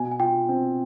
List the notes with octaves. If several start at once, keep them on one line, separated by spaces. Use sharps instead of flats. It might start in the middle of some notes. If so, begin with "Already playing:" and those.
Already playing: B2 G#5
G#5
F4 G5
C4